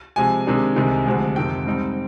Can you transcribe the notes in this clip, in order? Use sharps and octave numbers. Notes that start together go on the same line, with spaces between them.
C3 F3 G#3 G#5
C3 D#3 G#3 D4
C2 C3 D#3 G#3
D2 C3 F3 G#3
F2 C3 D#3 G5
G#2 G3 C4 D#4